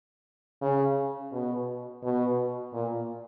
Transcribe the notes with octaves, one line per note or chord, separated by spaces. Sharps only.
C#3
B2
B2
A#2